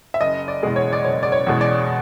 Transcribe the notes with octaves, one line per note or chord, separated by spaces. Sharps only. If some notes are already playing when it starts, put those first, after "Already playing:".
E5
F#1 D#5
D5
E2 B2 G#3
C#5
D5
F#1 C#5
D5
C#5
E2 B2 G#3
D5